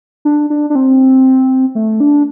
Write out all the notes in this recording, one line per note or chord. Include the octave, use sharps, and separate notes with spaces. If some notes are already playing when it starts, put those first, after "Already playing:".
D4
D4
D4
C4
A3
D4